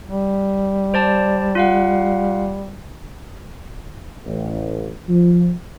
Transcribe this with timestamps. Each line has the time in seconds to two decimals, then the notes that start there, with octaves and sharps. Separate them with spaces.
0.08 G3
0.94 C5 D5 A5
1.55 F4 F5 F#5
4.26 A1
5.09 F3